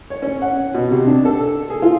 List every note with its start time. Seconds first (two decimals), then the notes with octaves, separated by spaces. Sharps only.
0.10 C#5
0.22 C#4
0.42 F#5
0.74 B2
0.91 C3
1.06 D4
1.25 A4
1.70 G#4
1.82 F4